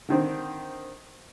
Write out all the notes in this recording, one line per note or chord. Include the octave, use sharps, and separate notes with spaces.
D3 D#3 C4